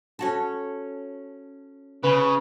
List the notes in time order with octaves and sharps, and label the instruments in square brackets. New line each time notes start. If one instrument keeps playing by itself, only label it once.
[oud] C#4 F#4 A4
[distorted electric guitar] C#3 [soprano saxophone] B4